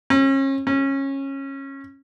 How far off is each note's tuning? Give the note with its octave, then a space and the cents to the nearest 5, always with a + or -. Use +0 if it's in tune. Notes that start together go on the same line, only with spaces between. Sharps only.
C#4 -35
C#4 -20